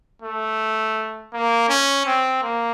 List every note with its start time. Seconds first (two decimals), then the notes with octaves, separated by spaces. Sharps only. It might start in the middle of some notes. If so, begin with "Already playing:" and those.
0.22 A3
1.33 A#3
1.69 C#4
2.06 C4
2.43 A#3